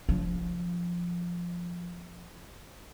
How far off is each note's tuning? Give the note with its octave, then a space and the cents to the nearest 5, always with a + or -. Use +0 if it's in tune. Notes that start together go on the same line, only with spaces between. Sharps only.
F3 +0 D4 -30